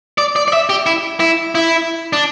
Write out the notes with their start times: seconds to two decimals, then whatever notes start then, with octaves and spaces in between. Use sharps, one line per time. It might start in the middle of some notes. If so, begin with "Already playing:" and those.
0.18 D5
0.36 D5
0.48 D5
0.53 E5
0.70 G4
0.86 E4
1.20 E4
1.55 E4
2.13 D4